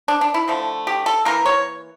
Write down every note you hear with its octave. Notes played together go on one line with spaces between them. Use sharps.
D4
D4
E4
D3 F3 A3
G4
A4
E3 A#3 A#4
C#5